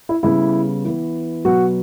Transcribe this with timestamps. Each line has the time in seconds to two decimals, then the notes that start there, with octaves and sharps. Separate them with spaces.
0.09 E4
0.23 C#3 G3 B3 E4
0.85 E3 B3
1.45 B2 F#3 B3 F#4